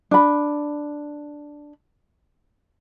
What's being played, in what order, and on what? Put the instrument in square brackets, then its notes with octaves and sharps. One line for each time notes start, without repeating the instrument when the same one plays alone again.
[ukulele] D4 B5